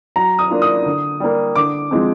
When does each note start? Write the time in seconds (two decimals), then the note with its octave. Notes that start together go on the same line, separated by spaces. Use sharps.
0.16 F#3 A#5
0.39 D#6
0.50 A#3 D4 F4
0.62 D#6
0.86 D3
1.20 G3 A#3
1.56 D3 D6
1.91 F3 G#3 C4